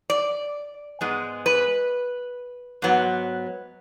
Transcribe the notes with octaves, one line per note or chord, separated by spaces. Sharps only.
D5
G#2 G#3 B3
B4
G#2 F#3 B3